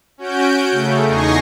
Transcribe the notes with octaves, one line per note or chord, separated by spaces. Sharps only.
C#4 F#4 G6 D7
C#3 A3
E2 D#4 G#5 C#6 A#6 C7